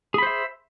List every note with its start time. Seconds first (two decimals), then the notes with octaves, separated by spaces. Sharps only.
0.14 G#4
0.18 B5
0.23 C5
0.27 E5